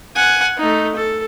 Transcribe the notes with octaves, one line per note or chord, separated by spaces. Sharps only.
F#5 G#5
A3 D#4
A4